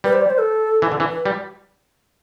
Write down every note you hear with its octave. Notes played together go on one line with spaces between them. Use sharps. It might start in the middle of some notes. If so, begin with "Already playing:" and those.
G3 B4
C5
D5
C5
A4
E3
D3
E3
B4
G3